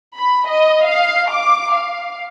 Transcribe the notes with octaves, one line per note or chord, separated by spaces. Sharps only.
B5
D#5
F5
D6
F5